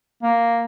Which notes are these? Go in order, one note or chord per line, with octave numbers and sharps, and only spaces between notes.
A#3